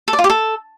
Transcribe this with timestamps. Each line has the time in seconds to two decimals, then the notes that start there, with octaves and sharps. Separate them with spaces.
0.08 A4
0.13 D5
0.19 F4
0.24 G4
0.30 A4